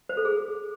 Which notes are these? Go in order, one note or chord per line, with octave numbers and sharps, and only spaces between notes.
C5
A4
G#4